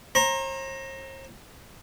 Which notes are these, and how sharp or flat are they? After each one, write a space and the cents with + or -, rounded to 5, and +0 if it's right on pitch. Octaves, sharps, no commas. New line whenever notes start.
C5 +45 A#5 +0